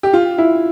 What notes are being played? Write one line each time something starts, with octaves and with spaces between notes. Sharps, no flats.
G4
F4
E4